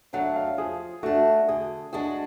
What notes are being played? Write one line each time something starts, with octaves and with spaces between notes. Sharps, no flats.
F#3 A3 D4 F#5
F5
F3 G#4
A3 D4 F#4
D3 G#4
G#3 D4 F#4 G#4